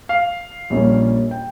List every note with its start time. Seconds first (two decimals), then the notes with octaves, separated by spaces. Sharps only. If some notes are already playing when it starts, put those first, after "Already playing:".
0.09 F5
0.70 A#1 A#2 G3 C#4
1.31 G5